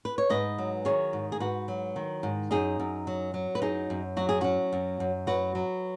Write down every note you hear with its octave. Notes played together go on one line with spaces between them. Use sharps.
B4
C#5
G#2 B4 D#5
F#3
D#3 G#4 C#5
G#2
G#4
G#2 F#4 B4
F#3
D#3
G#2
F#2 D#4 G#4
F#2
F#3
F#3
B4
F#2 D#4 G#4
F#2
F#3 F#4
G#4
F#3 C#4 F#4
F#2
F#2
F#3 F#4 B4
F#3